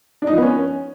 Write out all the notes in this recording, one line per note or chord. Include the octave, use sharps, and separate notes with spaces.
D4
D#4
F3
B3
C#4